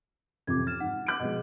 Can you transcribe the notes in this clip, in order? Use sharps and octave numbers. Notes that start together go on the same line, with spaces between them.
A1 F2 C3 D6 G#6
F6 A6 E7
G#2 F#5
D6 F#6 D7
B2 F3 G#3 D#5